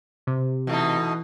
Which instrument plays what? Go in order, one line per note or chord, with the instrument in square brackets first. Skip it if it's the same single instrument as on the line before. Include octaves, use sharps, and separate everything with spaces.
[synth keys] C3
[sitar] B2 A3 D#4 [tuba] E3